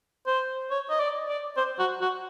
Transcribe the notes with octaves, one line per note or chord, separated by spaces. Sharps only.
C5
C#5
D#5
D5
D5
C5
F#4
F#4